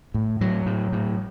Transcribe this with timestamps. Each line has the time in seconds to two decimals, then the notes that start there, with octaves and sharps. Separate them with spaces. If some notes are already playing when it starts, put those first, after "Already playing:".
0.14 A2
0.41 A2 F#3
0.66 A2
0.92 A2